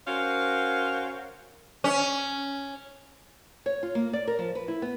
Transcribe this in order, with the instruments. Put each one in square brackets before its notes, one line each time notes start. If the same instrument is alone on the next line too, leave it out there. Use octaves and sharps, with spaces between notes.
[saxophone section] C#4 F#4 A#4 C5 C#5 F5
[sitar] C#4
[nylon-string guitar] C#5
F4
A#3
D5
A#4
F3
B4
E4
B3